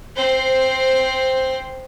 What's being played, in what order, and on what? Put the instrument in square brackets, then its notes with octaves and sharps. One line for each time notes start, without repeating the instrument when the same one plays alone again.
[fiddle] C4 C5